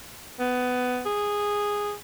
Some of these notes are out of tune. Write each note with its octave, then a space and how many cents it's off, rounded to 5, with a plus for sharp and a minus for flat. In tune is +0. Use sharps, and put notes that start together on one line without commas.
B3 +15
G#4 -10